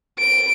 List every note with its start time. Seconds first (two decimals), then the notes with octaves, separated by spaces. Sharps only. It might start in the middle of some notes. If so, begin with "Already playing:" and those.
0.19 D7